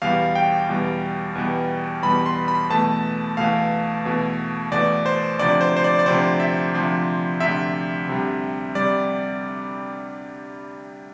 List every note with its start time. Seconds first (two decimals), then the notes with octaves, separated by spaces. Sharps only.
0.02 E2 B2 G3 F5
0.35 G5
0.69 E2 B2 G3
1.35 E2 B2 G3
2.02 E2 B2 G3 B5
2.26 C6
2.48 B5
2.70 E2 B2 A3 A5
3.37 E2 B2 A3 F5
4.05 E2 B2 A3
4.71 E2 B2 A3 D5
5.06 C5
5.39 D2 C3 F3 D5
5.61 C5
5.77 C5
5.84 D5
5.99 D5
6.06 D2 C3 F3 C5
6.40 E5
6.73 D2 C3 F3
7.40 D2 C3 F3 E5
8.08 D2 C3 G3
8.75 C3 G3 D5